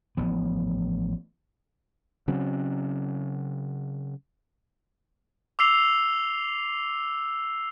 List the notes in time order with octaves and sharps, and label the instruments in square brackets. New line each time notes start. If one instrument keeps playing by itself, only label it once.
[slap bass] A1 F3 B3
[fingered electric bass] C#3 F#3 C4 C#4
[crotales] D6 E6 C7 F7 G7